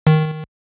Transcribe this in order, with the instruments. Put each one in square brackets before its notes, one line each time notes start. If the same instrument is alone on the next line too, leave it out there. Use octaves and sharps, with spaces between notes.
[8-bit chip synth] D#3